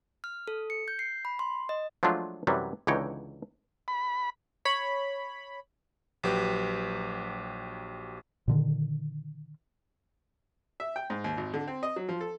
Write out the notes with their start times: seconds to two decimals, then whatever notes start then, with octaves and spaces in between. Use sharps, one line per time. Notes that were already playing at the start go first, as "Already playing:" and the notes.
0.24 F6
0.48 A4
0.70 C#7
0.88 G6
0.99 C7
1.25 B5
1.39 C6
1.69 D#5
2.03 F3 F#3 G#3 A3 D4 F4
2.47 F#2 C3 E3 F#3 G3
2.87 C#2 D3 E3 D#4 C#5 G5
3.88 B5
4.65 C#5 B5
6.23 A#1 F#3 G4 B4
8.48 A#2 D3 D#3
10.80 E5
10.96 G5
11.10 G#2
11.24 D#2
11.37 G#1
11.54 D3
11.67 C4
11.83 D#5
11.96 F#3
12.09 F3
12.21 A4